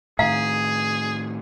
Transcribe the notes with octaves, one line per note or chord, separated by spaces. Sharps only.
A2 D#3 G#4 F5 F#5 A#5